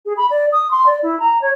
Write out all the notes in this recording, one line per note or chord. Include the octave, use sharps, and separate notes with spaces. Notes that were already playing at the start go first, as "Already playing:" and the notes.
G#4
B5
D5
D#6
C6
D5
E4
A#5
C#5